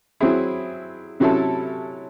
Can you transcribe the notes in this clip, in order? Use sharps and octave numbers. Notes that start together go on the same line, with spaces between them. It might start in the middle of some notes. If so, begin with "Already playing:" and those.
F#3 C4 E4 G#4
C3 F#3 C#4 E4 A4